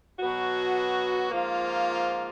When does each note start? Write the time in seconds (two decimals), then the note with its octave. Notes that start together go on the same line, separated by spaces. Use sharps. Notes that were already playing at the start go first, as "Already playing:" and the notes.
0.19 B2 F#3 B3 F#4
1.30 G#2 F3 A#3 F4